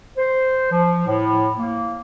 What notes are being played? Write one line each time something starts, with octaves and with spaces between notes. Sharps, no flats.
C5
F3
A2
A#3